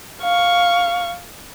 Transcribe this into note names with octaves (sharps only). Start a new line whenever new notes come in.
F5 C#6